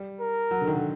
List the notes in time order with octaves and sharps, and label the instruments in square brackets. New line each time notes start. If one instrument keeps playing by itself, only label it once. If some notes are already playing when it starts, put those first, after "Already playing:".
Already playing: [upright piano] G3
[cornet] A#4
[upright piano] F#3
D3
D#3
D3